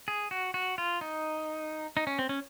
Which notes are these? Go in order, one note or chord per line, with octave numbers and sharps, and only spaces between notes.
G#4
F#4
F#4
F4
D#4
D#4
C#4
C4
C#4